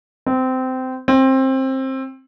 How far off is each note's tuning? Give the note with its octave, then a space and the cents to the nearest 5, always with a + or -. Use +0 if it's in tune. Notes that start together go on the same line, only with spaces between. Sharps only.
C4 -20
C4 +20